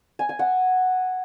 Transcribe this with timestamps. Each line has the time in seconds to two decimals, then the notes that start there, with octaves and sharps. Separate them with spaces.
0.19 G#5
0.29 G#5
0.39 F#5